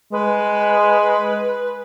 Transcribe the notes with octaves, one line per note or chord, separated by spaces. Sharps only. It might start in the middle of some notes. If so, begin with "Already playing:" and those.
G#3 B4